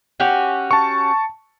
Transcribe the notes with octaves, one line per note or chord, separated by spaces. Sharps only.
C#4 F#4 G4
A5 C#6